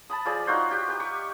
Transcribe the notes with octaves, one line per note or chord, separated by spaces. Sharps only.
A5 B5 D#6
F3 G#4 D5
D#4 F4 F#4 C5
G4 G5
G4 B4
C#6